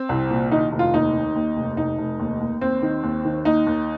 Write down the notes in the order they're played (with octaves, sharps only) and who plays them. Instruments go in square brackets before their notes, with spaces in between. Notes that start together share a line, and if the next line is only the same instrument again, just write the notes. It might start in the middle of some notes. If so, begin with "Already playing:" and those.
Already playing: [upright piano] C4
C2
A#2
D#3 D#4
F1
F4
D#2 D#4
D#3
D#2
F1
F1 D#4
F1
D#2
D#2
D#2 C4
D#3
D#2
D#3
D#2 D#4
D#2